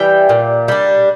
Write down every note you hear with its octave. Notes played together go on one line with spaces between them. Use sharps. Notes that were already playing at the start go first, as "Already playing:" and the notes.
Already playing: E3 G3 G5
A#2
G3 D4